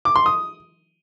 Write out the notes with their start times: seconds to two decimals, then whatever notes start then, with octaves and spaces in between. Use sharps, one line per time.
0.05 D6
0.16 C6
0.26 D#6